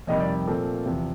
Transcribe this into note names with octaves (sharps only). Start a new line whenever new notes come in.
F2 C3 D#3 G3 D#5
D5
A#2 F3 A3 C4
E2 C3 F3